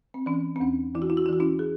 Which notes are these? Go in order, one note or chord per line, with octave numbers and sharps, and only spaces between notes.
C4
E3 C#4
C4
E2 C#4
E3 E4
F#4
E4
F#4
E4
E3 F#4
C#4 E4
G#4